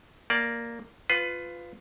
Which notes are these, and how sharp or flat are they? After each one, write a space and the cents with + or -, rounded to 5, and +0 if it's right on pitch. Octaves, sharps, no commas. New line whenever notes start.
A#3 +0 D5 +0
F4 +0 B4 +20